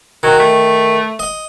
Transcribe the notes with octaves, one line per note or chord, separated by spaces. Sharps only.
D#3 F#3
A3
D#5